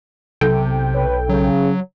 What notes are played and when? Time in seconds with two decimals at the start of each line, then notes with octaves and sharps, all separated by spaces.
0.41 B1 C3 A4 G5
0.95 B4 C#5
1.29 C#3 F#3